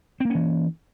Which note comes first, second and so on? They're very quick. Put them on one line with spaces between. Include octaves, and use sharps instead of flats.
C4 A#3 C#4 E3